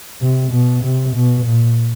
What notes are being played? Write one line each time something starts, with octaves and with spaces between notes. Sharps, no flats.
C3
B2
C3
B2
A#2